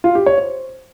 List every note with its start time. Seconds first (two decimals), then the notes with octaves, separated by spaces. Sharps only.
0.04 F4
0.15 G4
0.26 C#5
0.38 C5